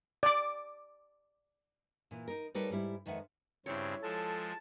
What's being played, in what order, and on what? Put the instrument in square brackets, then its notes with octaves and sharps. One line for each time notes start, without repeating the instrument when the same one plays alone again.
[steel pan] D5 D6
[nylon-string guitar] A#2 E3
D#4 A#4
G3 A3 D#4 A#4 B4 C#5
G#2 G3 E4
F2 D#3 G#3 B4 E5 F#5
[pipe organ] G2 C#3 C4 [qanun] E4 C#5
[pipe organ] F3 G#3 [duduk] A4 [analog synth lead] A5